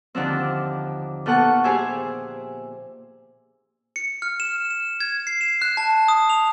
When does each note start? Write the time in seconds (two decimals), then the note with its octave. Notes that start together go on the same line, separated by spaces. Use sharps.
0.15 D#2 D3 F3 C4
1.26 A#2 B3 A4 F#5 C#6 F#6
1.64 G4 G#4 C5 E5 G#5
3.96 C#7
4.22 F6
4.40 E7
4.70 E7
5.00 G#6
5.27 C7
5.41 E7
5.62 F#6
5.77 A5
6.08 D#6
6.30 F7